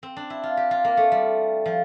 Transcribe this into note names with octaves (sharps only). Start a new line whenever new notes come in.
C4
D4
E4
F4
G4
F4
A#3
A3
G3
F3